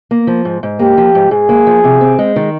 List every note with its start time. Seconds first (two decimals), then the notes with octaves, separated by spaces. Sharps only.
0.11 A#3
0.27 F3
0.45 G#2
0.63 G#2
0.79 A#3 G4
0.97 F3
1.15 G#2
1.31 G#2 G#4
1.49 A#3
1.67 F3
1.84 C3
2.01 C4
2.19 G#3
2.36 D#3